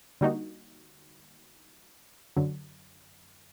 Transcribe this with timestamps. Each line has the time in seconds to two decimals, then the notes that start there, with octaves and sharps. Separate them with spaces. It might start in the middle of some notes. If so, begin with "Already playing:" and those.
0.21 D3 G3 A#3 D#4 F#4
2.36 F#2 D3 F#3